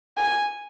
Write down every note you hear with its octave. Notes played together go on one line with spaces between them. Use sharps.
G#5